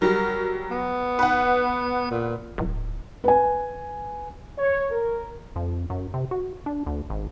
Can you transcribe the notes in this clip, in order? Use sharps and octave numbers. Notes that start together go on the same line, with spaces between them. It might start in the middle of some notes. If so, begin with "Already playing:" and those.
F#3 G3 A#4
B3
B4 F#5
A#2
D1
B4 G#5
C#5
A#4
F2
F#2
C3
F#4
D4
D2
G#1